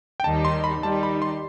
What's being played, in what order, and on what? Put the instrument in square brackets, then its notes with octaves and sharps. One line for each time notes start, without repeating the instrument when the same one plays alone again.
[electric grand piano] G5
[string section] D#2 D#3 G3 D#4 [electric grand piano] A5
[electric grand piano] C6
B5
[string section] D#3 G3 D#4 [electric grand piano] A5
[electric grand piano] B5
C6